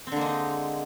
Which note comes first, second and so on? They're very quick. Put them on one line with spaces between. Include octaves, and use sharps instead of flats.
C4 D3 A#3 G#3 D#4